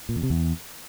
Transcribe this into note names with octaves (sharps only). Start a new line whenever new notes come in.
A#2
E2
C3
E2